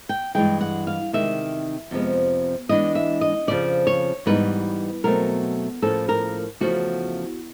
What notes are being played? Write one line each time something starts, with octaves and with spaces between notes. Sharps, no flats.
G5
G2 E3 G#3 G5
F#5
F5
C3 D#3 G#3 E5
F2 C3 F3 G#3 B3
E3 G#3 B3 D4 D#5
E5
D#5
F2 C#3 F3 D5
C#5
G#2 E3 G3 B3 D#4 B4
B2 F#3 A3 C4 A#4
A2 F3 A#3 C#4 A4
A#4
E2 C#3 F3 A3 F#4